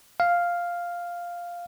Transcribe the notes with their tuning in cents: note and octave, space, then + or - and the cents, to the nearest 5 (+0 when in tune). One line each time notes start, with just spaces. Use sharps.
F5 +0